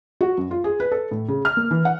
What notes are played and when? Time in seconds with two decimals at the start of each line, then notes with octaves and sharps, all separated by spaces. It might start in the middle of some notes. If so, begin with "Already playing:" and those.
0.21 F#4
0.38 F#2
0.51 F4
0.64 G#4
0.80 B4
0.92 A4
1.11 A2
1.28 C#3
1.45 F6
1.57 A#3
1.71 E3
1.85 F#5